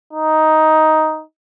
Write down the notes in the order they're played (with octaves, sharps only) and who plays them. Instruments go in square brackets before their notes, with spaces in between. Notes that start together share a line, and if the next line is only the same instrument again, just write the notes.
[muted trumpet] D#4